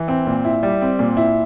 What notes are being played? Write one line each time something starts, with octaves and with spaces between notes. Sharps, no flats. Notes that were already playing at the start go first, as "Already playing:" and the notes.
Already playing: E3
C4
A#2
E4
G3
C4
A#2
E4